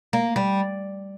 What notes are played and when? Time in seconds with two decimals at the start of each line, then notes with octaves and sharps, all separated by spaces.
0.13 A#3
0.36 G3